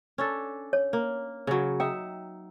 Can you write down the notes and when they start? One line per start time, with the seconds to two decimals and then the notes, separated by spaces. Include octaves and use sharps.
0.18 C#4 D4 A4
0.73 C#5
0.93 A#3
1.47 C#3 F#3
1.80 D#4 E5 G5